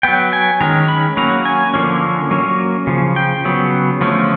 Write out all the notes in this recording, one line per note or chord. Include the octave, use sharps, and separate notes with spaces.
F#3 B3 G5
G#5
D#3 G#3 C#4 A#5
B5
F#3 A#3 C#4 A#5
G#5
D3 F3 A#3 C#4
F#3 A#3 C#4
C#3 F3
G5
C#3 F#3 B3
D3 F3 A3 C#4